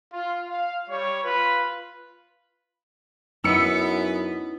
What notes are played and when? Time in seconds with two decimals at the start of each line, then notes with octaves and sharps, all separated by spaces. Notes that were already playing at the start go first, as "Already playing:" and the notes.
0.13 F4
0.48 F5
0.89 G3 C#5
1.24 F4 B4
3.44 F#2 B3 D#4 E4 E6 C#7